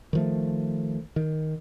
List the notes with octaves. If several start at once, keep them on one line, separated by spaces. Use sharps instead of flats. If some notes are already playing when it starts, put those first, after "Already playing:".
D#3 F3 A3
D#3